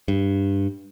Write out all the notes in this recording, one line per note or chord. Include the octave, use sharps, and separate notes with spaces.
G2